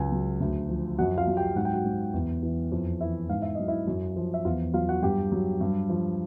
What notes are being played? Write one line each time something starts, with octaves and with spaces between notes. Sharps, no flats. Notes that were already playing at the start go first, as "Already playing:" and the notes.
Already playing: C#2 F#3 G#4 G#5
F#3
D2
F3
F#2 F#4 F#5
F4 F5
F#3
G4 G5
G#2 F#5
G5
F#4 F#5
G#2
E2
E3
F2
E3 E4 E5
G#2 F5
E5
F#3 D#5
E4 E5
F#2
F3
E5
E2 F4 F5
F#3 F4 F5
F#4 F#5
G2 G4 G5
F#3
G2
F3